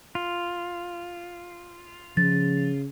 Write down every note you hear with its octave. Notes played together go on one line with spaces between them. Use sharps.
F4
C#3 F3 A6